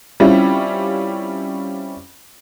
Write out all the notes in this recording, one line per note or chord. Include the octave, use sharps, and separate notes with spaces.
G3 C4 C#4 E4 F4